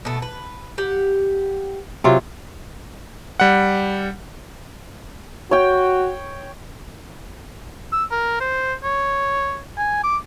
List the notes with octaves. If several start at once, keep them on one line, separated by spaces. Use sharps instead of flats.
B2 A3
B4
G4 F#5
C3 F#3 F4
G3 F#5
F#4 C#5 G5
E6
A#4
C5
C#5
G#5
D6